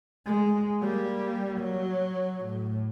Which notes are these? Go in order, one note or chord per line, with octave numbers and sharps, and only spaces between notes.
G#3
G3 A#3
F#3
A2